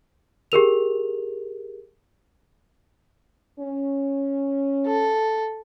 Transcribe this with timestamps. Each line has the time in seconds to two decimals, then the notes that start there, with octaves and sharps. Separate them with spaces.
0.52 G4 G#4 A#4 F7
3.59 C#4
4.87 A4